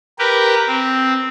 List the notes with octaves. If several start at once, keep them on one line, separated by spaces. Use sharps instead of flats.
G4 A#4 B4
C4